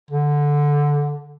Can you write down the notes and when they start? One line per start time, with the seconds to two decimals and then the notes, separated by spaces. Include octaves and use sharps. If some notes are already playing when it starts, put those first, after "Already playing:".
0.11 D3